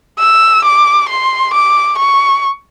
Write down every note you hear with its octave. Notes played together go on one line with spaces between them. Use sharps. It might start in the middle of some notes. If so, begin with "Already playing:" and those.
E6
D6
C6
D6
C#6